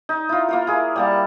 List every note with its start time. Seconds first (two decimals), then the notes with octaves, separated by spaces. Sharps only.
0.09 D#4
0.29 E4 F4
0.49 A#3 F4 A#4
0.67 E4 G#4
0.96 G3 A#3 A5